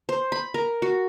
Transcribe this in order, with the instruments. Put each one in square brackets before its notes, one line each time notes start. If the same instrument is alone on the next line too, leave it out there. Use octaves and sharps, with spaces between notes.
[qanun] C5
B5
A#4
F#4